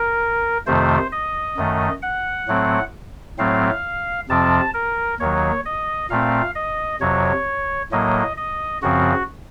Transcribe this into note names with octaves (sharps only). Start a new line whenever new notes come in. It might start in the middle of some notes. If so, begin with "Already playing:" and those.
Already playing: A#4
F2 C3 D#3 A3 C5
D#5
F#2 D#3 A3
F#5
A2 F#3 A3 C4
A2 F#3 A3 C4 F5
F2 C3 F3 C4 A5
A#4
D#2 D#3 F#3 C#5
D#5
A#2 A3 C4 F5
D#5
F2 C3 F#3 C#5
A2 F#3 A#3 D#5
D#5
F#2 C#3 F3 C4 F#4